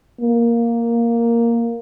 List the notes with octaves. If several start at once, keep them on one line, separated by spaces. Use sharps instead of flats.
A#3